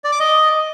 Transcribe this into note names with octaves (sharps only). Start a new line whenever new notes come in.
D5
D6
D#5